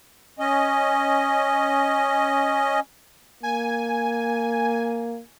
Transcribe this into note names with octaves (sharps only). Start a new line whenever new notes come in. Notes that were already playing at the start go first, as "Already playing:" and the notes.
C#4 D#5
A#3 G#5